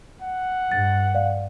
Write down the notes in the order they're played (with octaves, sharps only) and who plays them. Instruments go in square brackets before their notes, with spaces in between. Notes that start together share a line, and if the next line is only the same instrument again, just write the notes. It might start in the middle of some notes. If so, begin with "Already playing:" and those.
[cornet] F#5
[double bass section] G2 [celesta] A6
[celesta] D5 F5